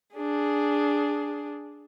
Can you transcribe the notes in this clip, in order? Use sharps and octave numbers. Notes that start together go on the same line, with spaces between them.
D4 G#4